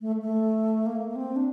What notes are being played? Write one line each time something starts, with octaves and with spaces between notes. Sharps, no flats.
A3
A3
A#3
A#3
C4
D4